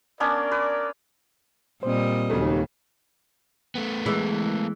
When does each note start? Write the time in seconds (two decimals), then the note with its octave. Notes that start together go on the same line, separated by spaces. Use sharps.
0.20 B3 C#4 D4 A#4 D5
0.52 B4
1.83 A#2 G3 C4 C5 D#5
2.30 D#2 C#3 F#3 A3
3.75 A3 B3
4.06 E3 G#3 E4